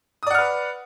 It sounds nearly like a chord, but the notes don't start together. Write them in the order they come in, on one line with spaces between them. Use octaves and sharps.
D#6 D5 F#5 F6 B4